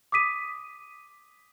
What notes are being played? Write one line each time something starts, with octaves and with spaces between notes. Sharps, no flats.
D6 D#6 B6 D#7